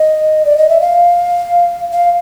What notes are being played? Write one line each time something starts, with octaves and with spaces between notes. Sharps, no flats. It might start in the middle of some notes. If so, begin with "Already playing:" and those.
Already playing: D#5
D5
D#5
E5
F5
F5